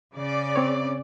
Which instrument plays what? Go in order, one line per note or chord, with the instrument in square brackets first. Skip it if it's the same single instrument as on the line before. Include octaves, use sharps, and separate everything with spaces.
[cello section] C#3 D5
[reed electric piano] C4 C#5